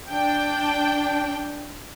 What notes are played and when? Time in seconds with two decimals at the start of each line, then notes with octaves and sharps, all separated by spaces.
0.10 D4 G5